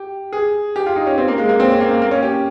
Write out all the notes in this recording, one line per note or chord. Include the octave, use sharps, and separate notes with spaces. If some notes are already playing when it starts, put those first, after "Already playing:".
Already playing: G4
G#4
G4
F4
D#4
C#4
C4
A#3
G#3
A#3
C4
C#4
A#3
A#3
A#3
C#4
G4